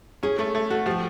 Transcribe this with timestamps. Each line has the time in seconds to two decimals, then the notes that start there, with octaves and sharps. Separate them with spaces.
0.23 C#4 G#4
0.39 A3 A4
0.55 A3
0.70 F#4 A4
0.86 F3 G4